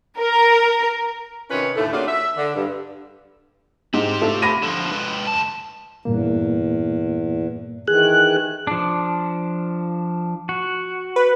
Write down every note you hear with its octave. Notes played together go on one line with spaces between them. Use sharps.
A#4
C3 D#3 C#4 F4 B4 C#5
D#2 A2 D3 A3
A#3 C#4 D4 F4 F#4 G#4
E5
D3
G2
G#2 C4 G4
A3 F4
B5 A#6 D#7
D3 F3
G#3 B4
C#2 A5
E2 G2 A#2 A#3
D#3 E3 G#4 F#6
F3 D4
F#4
B4